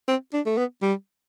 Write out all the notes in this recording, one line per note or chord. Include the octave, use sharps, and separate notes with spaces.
C4
D4
A3
B3
G3